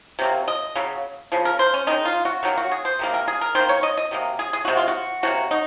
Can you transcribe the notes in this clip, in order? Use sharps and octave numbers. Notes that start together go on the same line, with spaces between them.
C3 F#3 A#3
D#5
C#3 F#3
C#3 F3
A#4
C5
C#4
D#3 G#3 D#4
F4
F#4
D#3 F#3 A#3
F#4
G#4
C5
C3 D#3 A#3
A#4
G#4
A#4
D#3 C5
A#3
C#5
D#5
D#5
C3 F#3 A#3
G#4
G#4
C3 F3 G#3 F#4
F4
F#4
C3 F#3 A#3 F#4
D#4